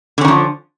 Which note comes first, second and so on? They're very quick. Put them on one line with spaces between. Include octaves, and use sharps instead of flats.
D3 C#4 D#3 F3